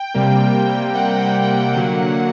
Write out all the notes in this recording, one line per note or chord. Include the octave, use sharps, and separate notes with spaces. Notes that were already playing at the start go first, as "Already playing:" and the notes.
Already playing: G5
C3 G3 A#3
F#5
D3 F#3 A#3